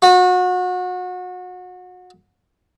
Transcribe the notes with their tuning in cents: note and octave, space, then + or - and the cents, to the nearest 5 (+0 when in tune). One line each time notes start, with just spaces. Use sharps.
F#4 -30